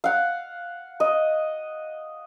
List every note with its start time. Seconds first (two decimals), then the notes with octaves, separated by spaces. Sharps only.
0.04 F5 F#5
1.00 D#5